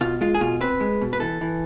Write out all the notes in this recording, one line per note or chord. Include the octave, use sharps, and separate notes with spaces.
B2 F4
G#3 F4
G#4
B2 F4
C4 B4
G#3
B2
B4
E3 A4
E3